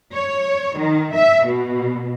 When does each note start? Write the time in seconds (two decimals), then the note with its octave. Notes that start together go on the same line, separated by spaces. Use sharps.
0.13 C#5
0.79 D#3
1.15 E5
1.46 B2